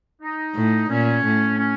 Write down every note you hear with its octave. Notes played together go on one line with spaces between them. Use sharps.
D#4
A2
A#2 C#4
A2
C#4